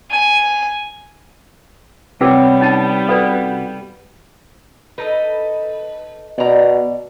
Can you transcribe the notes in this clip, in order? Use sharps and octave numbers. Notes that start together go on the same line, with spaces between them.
G#5
C3 G3 B3 G4 B4 C#5 F#5 E6
C#4 D#4 A5
F#4 A4 B4 D5 F5
D#4 A4 B4 D#5
B2 D5 A#5